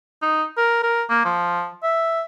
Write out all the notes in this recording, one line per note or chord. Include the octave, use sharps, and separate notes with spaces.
D#4
A#4
A#4
A#3
F3
E5